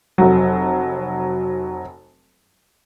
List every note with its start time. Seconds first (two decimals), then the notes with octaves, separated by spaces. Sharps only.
0.18 F1 F#3